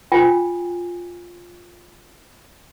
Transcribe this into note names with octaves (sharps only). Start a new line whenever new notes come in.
F4 G5 G#5